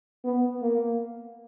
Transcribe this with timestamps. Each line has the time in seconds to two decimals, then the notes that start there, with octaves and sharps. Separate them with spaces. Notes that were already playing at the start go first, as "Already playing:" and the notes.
0.24 B3
0.62 A#3